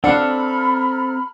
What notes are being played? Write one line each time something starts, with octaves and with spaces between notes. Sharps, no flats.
C4 D4 A4 F5 F#5 A#5 B5 F6